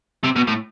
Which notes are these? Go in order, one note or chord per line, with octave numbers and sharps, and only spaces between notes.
C3
B2
A2